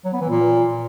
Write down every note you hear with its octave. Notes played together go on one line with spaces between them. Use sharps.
F#3
B3
E3
A#2